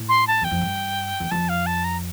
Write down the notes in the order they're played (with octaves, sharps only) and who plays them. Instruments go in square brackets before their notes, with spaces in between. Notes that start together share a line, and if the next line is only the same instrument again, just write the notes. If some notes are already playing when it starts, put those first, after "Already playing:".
Already playing: [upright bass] A2
[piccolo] C6
A5
[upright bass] E2 [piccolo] G5
[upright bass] F2
G2
E2
[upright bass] F2 [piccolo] A5
[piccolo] F5
A5
A#5